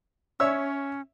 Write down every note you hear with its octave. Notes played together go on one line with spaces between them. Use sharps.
C#4 C#5 E5 E6